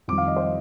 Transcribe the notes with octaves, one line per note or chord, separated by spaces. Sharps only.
F2 D#3 G3 D6
F5
D#5
C5